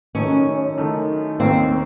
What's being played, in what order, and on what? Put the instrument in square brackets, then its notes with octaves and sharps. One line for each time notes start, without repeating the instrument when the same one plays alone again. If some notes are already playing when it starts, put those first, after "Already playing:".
[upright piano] F#2 D#3 A3 D#4 [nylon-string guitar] C#4
[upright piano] F#2 D#3 A3 D#4
[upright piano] D#2 D#3 A#3 C#4 [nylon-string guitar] C4